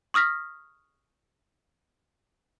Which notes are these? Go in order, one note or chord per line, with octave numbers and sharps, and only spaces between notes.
C#6 D#6 F6 A#6 B6